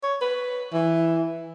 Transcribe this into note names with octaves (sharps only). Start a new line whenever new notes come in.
C#5
B4
E3